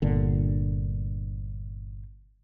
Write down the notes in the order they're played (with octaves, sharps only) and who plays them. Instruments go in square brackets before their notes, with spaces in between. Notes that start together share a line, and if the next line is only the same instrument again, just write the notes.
[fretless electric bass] G1 A#2 D3